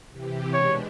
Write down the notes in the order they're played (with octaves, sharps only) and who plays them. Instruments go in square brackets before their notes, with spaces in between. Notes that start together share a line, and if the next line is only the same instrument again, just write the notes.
[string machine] C3 E3 G4
[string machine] B2 G#3 D4 [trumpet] C#5